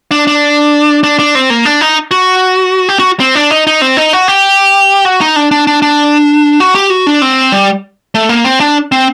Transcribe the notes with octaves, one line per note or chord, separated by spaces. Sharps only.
D4
D4
D4
D4
C4
A#3
D4
D#4
F#4
G4
F#4
C4
D4
D#4
D#4
C4
D#4
F#4
G4
F#4
D#4
D4
D4
D4
D4
F#4
G4
F#4
D4
C4
G3
A3
A#3
C4
D4
C4